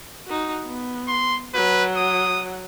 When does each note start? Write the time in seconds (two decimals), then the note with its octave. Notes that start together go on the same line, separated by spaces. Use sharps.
0.26 D#4 F#4
0.66 B3
1.08 C6
1.54 F#3 B4 F#5
1.97 D#6